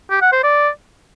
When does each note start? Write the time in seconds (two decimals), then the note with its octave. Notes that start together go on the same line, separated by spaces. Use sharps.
0.10 G4
0.21 F#5
0.32 C5
0.43 D5